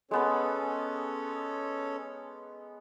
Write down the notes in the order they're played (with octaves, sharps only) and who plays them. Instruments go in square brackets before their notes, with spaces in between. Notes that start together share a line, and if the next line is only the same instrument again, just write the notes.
[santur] G#3 B3 B4 [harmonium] C#4 A4 C#5